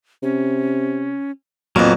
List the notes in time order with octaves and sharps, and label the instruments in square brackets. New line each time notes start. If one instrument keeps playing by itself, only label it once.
[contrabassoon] C3 [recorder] C#4
[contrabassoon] F#1 [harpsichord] F2 A#2 [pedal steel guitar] F#3 A#3 B3